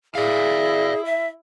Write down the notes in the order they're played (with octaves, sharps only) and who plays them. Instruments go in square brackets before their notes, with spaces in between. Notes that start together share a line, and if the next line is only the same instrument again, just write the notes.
[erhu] E4 [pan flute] G#4 [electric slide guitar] D5 F5
[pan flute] E5